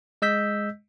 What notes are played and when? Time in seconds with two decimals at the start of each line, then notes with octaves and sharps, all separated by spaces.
0.22 G#3 D#5 E6 G6 B6